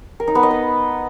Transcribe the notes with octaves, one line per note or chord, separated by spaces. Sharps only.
A#4
D#4
B3
D#5
B4